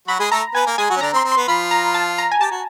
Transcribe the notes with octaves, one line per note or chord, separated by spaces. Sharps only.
F#3 F#4 B5
G#3 G#4
A3 A4 A#5
B3 B4 G#5
A#3 A#4
G#3 G#4 G#5
F#3 F#4
C#4
D3 D4 A#5
C4
C6
C4
B3 C6
F3 F4 B5
A#5
A5
A#5
G#5
G4 A5
F#4